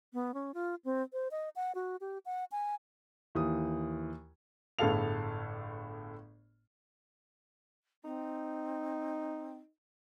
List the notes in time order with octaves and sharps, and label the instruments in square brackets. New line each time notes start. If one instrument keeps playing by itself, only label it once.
[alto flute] B3
C#4
F4
C4
C5
D#5
F#5
F#4
G4
F#5
G#5
[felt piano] D#2 E3 D#6
[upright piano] G1 A2 G#4 A4 F5 F7
[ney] C4 [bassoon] D#4